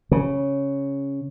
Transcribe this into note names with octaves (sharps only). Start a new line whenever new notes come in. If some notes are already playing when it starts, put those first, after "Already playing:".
C#3